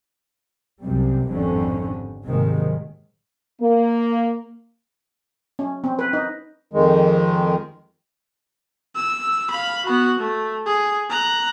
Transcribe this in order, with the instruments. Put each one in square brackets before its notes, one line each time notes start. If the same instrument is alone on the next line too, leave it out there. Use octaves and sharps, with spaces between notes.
[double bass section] C2 F#2 C3 G3
G#1 F2 A2 D3 G3 C#4
A#1 G#2 C3 D#3 F#3 G#3
[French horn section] A#3
[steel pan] C#4
C4
B4
D#4
[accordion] F2 D#3 G#3
[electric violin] E6
F5 B5
B3 F#4
A3
G#4
A#5 F#6